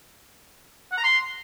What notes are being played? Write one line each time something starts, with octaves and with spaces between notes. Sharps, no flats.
F#5
A#5
C6